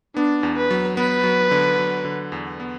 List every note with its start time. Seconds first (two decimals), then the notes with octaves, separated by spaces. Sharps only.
0.16 B3 D4
0.43 E2
0.57 B4
0.71 F#3
0.97 B3 B4
1.24 F#3
1.51 D3
1.78 F#3
2.05 D3
2.32 E2
2.60 B3